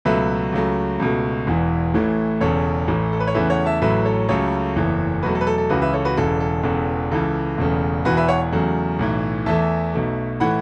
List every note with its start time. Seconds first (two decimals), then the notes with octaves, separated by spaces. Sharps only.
0.05 C#2 B2 F#3 A3 B4 E5
0.52 C#2 C#3 F#3 A3
1.00 C#2 B2 A3
1.47 E1 E2 E3
1.94 A1 A2 E3 A3
2.41 E1 E2 C#3 A4 C#5
2.88 A1 A2 E3 A3
3.13 A4
3.20 B4
3.27 C#5
3.35 E2 C#3 E3 A3 B4 E5
3.50 C#5 F#5
3.66 E5 A5
3.82 A1 A2 F#3 A3 B4 E5
4.05 A4 C#5
4.29 C#2 C#3 F#3 A3 A4 C#5
4.76 F#1 E2 E3 A3
5.23 E2 B2 F#3 A3 F#4 B4
5.35 A4
5.41 B4
5.47 A4
5.58 A4
5.70 C#2 C#3 E3 F#4 B4
5.82 B4 E5
5.93 A4 C#5
6.05 F#4 B4
6.17 E1 E2 C#3 E3 A4
6.40 A4
6.64 E1 E2 C#3 A4
7.11 C#2 C#3 E3 A4
7.58 E1 E2 C#3 A3
8.05 E1 E2 E3 F#4 B4
8.17 B4 E5
8.28 C#5 F#5
8.52 E2 C#3 F#3 A3
8.99 B1 A2 E3
9.46 E2 E3 A3 E5 A5
9.94 B1 B2 A3
10.40 A2 E3 A3 F#5 B5